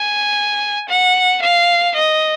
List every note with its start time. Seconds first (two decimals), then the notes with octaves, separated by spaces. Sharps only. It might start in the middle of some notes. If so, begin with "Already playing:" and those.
Already playing: G#5
0.89 F#5
1.42 F5
1.95 D#5